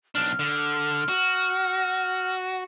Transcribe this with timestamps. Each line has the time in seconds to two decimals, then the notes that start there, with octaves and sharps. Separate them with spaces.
0.15 B1 D4 F6
0.39 D3
1.09 F#4